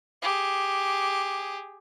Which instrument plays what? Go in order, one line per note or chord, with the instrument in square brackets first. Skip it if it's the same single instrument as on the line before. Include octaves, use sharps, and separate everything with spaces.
[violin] G4 G#4